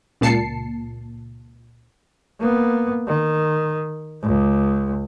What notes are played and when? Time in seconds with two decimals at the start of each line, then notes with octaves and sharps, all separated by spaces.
0.21 C#2 A#2 A5 C7 C#7
2.40 A#3 B3
3.07 D#3
4.23 C#2